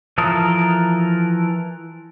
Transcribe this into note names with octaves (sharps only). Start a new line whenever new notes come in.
E3 F3 A4 A#4 D#6